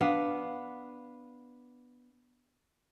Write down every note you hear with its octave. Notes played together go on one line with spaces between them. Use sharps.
B3 D4 F5